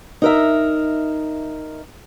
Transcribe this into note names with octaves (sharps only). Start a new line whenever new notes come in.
D#4 A#4 E5